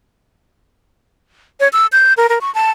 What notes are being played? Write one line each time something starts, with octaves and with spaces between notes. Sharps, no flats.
C#5
E6
G6
A#4
A#4
C#6
A5